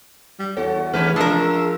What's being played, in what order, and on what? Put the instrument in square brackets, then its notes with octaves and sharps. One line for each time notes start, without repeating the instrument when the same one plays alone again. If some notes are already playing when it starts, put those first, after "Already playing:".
[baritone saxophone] G3
[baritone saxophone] E2 [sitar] F#4 [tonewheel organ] A4 C#5
[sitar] B2 C#4 B4 [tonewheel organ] E3 G#4 F6 [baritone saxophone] A3
[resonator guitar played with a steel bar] F3 A#4 [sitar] G#3 [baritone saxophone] D4 [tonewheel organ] E6